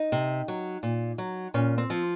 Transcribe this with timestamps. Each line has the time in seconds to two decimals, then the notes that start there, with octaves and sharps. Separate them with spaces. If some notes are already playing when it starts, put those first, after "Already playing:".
Already playing: D#4
0.12 C3
0.48 F#3
0.83 A#2
1.18 F#3
1.54 A#2 C#4
1.78 C4
1.90 F3